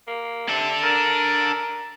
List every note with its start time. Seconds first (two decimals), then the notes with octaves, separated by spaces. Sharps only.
0.07 A#3
0.49 C3 D4 A4
0.83 A#4